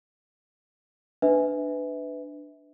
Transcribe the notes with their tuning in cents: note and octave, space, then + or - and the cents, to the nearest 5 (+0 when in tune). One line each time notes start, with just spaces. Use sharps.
D4 +10 B4 +20 E5 -25